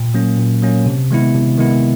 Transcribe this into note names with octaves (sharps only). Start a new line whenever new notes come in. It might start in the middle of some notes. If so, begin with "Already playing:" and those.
Already playing: A#2
F#3 A#3 C#4
A#2
F#3 A#3 C#4
C3
D#3 G#3 B3 E4
C3
D#3 G#3 B3 E4